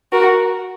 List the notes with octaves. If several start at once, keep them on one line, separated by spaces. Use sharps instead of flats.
F#4 A#4